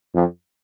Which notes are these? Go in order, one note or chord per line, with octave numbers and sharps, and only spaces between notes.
F2